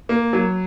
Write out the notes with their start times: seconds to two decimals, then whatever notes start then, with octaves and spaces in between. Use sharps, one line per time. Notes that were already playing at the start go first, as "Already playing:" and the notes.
0.09 A#3
0.33 F#3